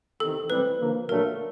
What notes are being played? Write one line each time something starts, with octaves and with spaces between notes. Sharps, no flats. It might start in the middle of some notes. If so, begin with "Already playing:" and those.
E2 C3 D#3 A4
B1 A2 E3 G3 C4 B4
D3 F3 A#3
A#1 A#2 F#3 A3 D4 A#4